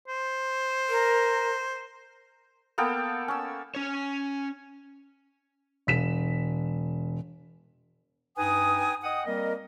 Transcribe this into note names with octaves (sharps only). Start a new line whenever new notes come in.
C5
A#4
A#3 B3 A4 G5
C#4 E6
C#4 C#5
E1 B6 E7
G2 D#4 B4 G5 G#5 D#6
D#5 F#5 G5 D#6
G3 A#3 C4 A#4 D#5